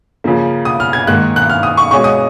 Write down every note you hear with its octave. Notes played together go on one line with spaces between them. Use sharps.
C#3 F3 A#3
D#6
F6
G#6
G#2 D#3 A#3 F#6
F#6
F6
D#6
C#6
B2 G#3 C#4 C#6
D#6